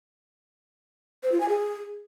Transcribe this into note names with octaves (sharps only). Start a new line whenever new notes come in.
C5
F4
G#5
G#4